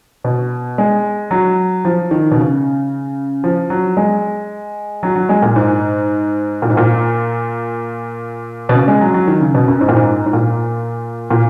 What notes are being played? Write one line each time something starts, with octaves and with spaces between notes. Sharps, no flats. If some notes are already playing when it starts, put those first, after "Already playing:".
B2
G#3
F#3
F3
D#3
B2
C#3
F3
F#3
G#3
F#3
F#3
G#3
A#2
G#2
A#2
G#2
A#2
B2
C#3
G#3
F#3
F#3
D#3
C#3
B2
F#2
G#2
A#2
G#2
G#2
A#2
A#2